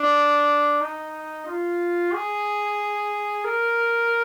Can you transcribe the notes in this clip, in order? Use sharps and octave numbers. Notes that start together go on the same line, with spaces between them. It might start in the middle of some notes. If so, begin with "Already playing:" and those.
Already playing: D4
D#4
F4
G#4
A#4